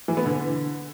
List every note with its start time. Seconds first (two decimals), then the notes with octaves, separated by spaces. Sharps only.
0.08 E3
0.17 B3
0.26 D3